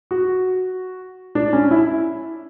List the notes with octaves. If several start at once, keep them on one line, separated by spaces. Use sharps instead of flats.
F#4
D4
C#4
E4